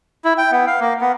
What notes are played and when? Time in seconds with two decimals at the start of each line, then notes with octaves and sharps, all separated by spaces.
0.25 E4
0.38 G5
0.52 B3
0.67 F5
0.80 A#3
1.01 B3